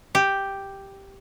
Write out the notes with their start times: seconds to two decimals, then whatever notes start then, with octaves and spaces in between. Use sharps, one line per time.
0.15 G4